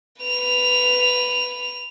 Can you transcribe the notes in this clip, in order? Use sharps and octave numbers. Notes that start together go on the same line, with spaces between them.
B4 F7